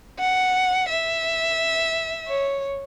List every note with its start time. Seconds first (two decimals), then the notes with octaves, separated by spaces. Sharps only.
0.19 F#5
0.89 E5
2.28 C#5